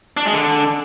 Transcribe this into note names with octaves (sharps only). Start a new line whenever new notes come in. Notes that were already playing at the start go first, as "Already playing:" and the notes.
D4
G#3
D3